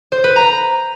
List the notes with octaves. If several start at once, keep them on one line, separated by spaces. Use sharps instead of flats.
C5
B4
A#5